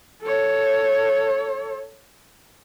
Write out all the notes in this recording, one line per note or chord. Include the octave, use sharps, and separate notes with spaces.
A4 C#5